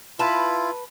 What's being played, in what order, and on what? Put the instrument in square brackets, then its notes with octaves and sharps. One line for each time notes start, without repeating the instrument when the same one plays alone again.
[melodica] E4 F4 [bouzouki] B4 A5